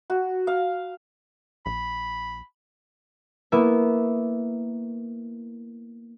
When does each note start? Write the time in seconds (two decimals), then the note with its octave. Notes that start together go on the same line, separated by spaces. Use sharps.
0.10 F#4
0.47 F5
1.66 A#1 B5
3.52 A#3 B3 E4 E5